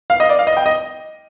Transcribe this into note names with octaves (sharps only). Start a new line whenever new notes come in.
F5
D#5
D5
F5
D#5
G5
D#5